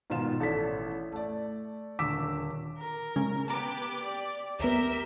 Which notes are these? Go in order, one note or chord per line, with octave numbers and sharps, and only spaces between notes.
G#2 B2 D#3 F4 E7
A1 A4 D5 B6
A3 D5
D#1 D3 D6 E6 B6 E7
A#4
C#3 G#3 C#4
B3 G4 A5 A#5 D6
D5
D#2 B3 G4 A#4 E5